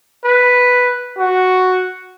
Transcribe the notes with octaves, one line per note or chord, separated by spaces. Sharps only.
B4
F#4